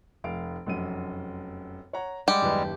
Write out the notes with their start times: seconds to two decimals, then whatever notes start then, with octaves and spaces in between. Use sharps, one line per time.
0.24 F1 F5 D7
0.66 F1 F#2 D#7
1.93 C#5 F#5 A#5
2.28 G3 G#3 G4 F#5
2.42 F#1 D#2 B4